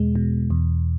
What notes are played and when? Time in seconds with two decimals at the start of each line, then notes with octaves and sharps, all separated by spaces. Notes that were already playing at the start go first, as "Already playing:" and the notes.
Already playing: E2 B2 G#3
0.15 B2
0.50 E2